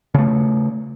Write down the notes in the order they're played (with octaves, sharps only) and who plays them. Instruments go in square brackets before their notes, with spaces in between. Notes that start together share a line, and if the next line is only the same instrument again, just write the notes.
[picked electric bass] C#3 A3